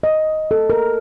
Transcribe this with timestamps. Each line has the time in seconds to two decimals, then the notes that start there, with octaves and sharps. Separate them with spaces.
0.03 D#5
0.51 A4
0.70 A#4